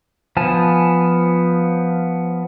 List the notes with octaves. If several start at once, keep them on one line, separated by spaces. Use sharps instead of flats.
F3 B3 G#5 A5